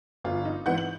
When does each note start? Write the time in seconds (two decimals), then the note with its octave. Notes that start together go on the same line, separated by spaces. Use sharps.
0.24 G1 F4
0.45 D#4
0.66 G#2 E3 B3 F#5 G6
0.78 F#7